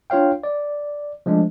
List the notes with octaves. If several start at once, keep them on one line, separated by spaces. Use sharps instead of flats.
D4 F4 C#5 F5 G5
D5
F3 G#3 A3 D4